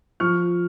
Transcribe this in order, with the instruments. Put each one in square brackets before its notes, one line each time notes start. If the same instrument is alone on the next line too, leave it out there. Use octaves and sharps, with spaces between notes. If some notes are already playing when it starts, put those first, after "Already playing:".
[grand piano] F3 C#6 F6